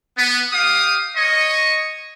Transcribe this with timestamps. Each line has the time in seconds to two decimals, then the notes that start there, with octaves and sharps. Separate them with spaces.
0.18 B3
0.53 G4 F5 D#6
1.17 C#5 D#5 C#6